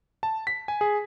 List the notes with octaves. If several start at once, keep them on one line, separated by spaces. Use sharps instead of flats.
A5
B6
G#5
G#4